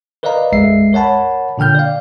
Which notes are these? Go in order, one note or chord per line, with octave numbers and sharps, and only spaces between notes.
A#4 B4 D5 D#5 F5 A#5
B1 F#2 G#3 E5 C7
A#4 C#5 F#5 A5 B5
A#2 D3 G5 F6 G6
D5 F5